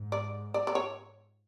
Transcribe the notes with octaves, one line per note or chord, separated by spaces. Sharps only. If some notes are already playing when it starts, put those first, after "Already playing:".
Already playing: G#2
D5
D5
D5
C#5